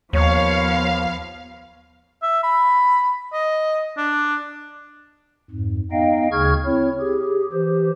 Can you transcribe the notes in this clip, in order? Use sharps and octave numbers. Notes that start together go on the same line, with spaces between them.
D#2 F3 B3 C#5 F5
E5
B5
D#5
D4
F2 G#2
B3 D#4 D#5 F5 G5
D2 C#3 G#4 C#6 F6 G#6
C4 E4 C#5
G4 G#4
E3 G4 C5